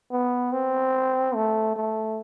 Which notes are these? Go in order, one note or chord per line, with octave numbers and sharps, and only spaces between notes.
B3
C4
A3
A3